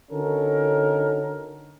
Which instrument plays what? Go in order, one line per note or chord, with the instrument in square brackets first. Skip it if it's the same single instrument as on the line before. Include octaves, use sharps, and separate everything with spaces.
[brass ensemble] D3 C#4 D#4 F#4 A4 A#4